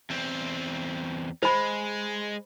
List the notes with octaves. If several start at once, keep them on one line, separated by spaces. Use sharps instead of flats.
E2 C4
G#3 C5 B5